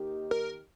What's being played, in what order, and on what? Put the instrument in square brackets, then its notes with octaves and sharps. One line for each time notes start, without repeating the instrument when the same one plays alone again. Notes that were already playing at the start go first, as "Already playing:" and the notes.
Already playing: [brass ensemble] D#2 D#3 A#3 D#4 G4
[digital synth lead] A#4